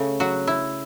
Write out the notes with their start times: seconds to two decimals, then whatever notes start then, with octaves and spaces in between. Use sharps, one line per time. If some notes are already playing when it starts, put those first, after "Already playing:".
Already playing: C#3 A3
0.20 F#3 F#4
0.47 E4